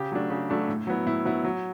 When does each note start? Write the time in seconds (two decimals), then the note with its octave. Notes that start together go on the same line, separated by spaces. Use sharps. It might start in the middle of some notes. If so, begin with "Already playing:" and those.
Already playing: C#3 G4
0.12 F#3 A3 D4
0.30 C#3
0.50 F#3 A3 D4
0.69 A2
0.87 F#3 B3 E4
1.06 A2 E4
1.25 F#3 B3 E4
1.45 F#3